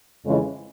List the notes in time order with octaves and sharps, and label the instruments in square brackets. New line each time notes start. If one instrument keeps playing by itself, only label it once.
[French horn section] F2 C#3 E3 G#3